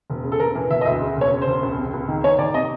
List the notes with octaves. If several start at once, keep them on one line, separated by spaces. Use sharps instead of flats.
E1
C#3
A4
E1 A#4
E3
E1 E5
D#5
D2 E5
C#3
E1 C#5
C#3
C5
E1
C#2
C3
C#2
D#3
D#3 C#5
D#3 D5
C3 D#5